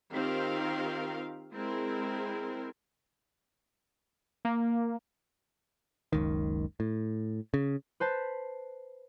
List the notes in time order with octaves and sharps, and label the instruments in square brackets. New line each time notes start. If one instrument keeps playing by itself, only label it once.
[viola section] D#3 C4 F4 G4 A#4 F5
G#3 C4 E4 A#4
[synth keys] A#3
[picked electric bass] F#1 C#2 D#3
A2
C#3
[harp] B4 C5 A5 B6